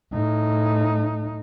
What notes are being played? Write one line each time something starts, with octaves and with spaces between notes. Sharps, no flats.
A2 D#4